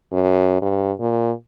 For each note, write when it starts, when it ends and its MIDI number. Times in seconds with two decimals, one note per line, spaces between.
0.12 0.58 42
0.62 0.92 43
1.00 1.31 46